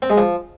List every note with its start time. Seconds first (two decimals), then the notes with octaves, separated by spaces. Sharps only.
0.02 C4
0.10 G#3
0.17 F3